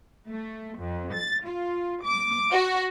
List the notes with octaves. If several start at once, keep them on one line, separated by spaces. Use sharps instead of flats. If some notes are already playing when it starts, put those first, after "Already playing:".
A3
F2
A6
F4
D6
F#4